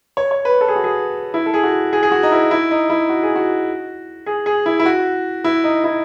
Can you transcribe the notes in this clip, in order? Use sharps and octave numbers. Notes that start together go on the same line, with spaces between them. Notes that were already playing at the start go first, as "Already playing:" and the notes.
C#5
C#5
B4
A4
G#4
F#4
G#4
E4
A4
G#4
F#4
G#4
G#4
F#4
D#4
E4
E4
D#4
E4
F#4
G#4
F#4
G#4
G#4
E4
E4
F#4
E4
D#4
E4